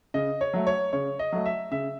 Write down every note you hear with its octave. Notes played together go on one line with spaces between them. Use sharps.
C#3 D#5
C#5
F#3 A3
C#5
C#3 C#5
D#5
F#3 A3
E5
C#3 E5